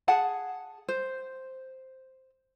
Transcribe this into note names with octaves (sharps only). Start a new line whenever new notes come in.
G#4 F#5 A5
C5